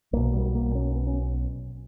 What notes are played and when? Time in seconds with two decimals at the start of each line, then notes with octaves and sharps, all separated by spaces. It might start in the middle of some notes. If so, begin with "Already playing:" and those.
0.13 B1 B2 A#3
0.33 G3
0.55 A#3
0.75 C#4
0.96 B3
1.07 C#4